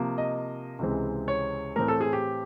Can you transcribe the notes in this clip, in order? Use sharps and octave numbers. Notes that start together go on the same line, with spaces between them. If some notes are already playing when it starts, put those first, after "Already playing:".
Already playing: C3 F3 A#3
D#5
C#2 C3 E3 G#3 C4
C#5
A2 E3 A3 C4 A#4
A4
G#4
G4